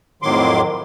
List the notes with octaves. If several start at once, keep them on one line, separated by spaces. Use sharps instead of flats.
F2 A2 D#3 F#3 C6 D6